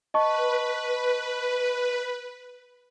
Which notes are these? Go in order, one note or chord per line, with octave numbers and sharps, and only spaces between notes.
B4 D#5 A5 C#6